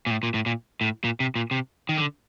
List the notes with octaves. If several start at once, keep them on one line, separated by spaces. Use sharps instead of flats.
A#2
A2
A#2
A2
A#2
A2
A#2
C3
A#2
C3
D#3
D3